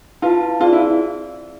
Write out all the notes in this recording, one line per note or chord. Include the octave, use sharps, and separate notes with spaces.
E4 F4 B4 F5 A5
C4 F4 G#4 D5
E4